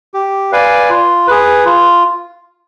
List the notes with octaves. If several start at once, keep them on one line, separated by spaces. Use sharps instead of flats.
G4
B4 D5 F5 G#5
F4
G#4 B4
F4